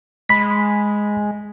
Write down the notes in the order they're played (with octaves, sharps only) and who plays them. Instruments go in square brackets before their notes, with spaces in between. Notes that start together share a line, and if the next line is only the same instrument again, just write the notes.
[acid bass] G#3 [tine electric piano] B5 B6